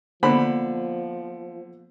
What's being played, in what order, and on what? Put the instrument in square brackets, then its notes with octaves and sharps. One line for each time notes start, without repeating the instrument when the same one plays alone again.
[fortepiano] D3 C5 B5 [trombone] F3 [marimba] A#3 B3